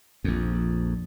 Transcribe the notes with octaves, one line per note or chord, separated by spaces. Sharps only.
A#1 F2